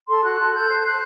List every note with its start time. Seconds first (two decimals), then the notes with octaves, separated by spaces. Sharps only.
0.08 A4 C6
0.23 F#4 F#6
0.38 A4
0.53 A4 G6
0.69 C5
0.79 G6
0.84 C5 F#6